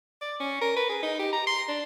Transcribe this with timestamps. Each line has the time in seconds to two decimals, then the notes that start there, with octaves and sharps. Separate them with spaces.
0.21 D5
0.40 C#4
0.61 A#4
0.76 B4
0.89 G#4
1.03 D#4
1.19 G4
1.33 A#5
1.47 C6
1.68 D4